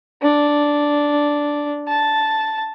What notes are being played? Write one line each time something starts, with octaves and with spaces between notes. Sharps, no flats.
D4
A5